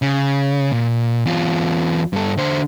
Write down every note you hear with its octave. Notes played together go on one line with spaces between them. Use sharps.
C#3
A#2
E2 F4
G2 A4
D3 C5